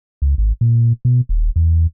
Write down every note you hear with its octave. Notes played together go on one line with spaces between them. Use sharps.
C#2
G#1
A#2
B2
D#1
E2